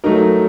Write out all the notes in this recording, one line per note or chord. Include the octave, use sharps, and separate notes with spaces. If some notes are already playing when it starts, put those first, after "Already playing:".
F#3 A3 D#4 A#4